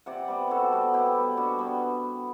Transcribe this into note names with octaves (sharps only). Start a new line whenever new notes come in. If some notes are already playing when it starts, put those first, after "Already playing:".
C3 D5 F#5
G3 B3
C3 F#4 A4
G3 B3
B2 E4 G4
G3 B3
B2 D4 F#4
G3 B3